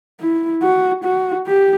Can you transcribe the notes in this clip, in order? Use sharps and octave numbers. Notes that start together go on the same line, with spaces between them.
E4
F#4
F#4
G4